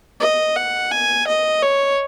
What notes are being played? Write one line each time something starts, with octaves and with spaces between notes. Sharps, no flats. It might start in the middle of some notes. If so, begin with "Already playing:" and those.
D#5
F#5
G#5
D#5
C#5